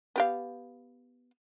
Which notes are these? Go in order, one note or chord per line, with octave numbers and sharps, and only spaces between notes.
B3 G4 F5